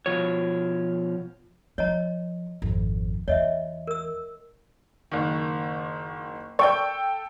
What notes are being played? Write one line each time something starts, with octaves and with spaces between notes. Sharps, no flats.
B2 F3 C#5
F3 C#5 D#5 A#5
G#1 F2
E2 C#5 D#5 E5
A#4 E6
F#1 D#3
A4 D5 G5 C#6 G6